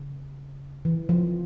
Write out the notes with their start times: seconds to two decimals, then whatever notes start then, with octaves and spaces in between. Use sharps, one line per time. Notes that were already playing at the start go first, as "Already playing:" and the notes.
Already playing: C#3
0.85 E3
1.09 F3